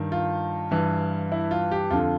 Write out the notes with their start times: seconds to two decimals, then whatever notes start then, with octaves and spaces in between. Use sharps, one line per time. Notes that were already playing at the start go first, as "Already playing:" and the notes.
Already playing: G2 D#3
0.12 F4
0.71 G2 E3
1.32 E4
1.51 F4
1.72 G4
1.90 F2 D3 F4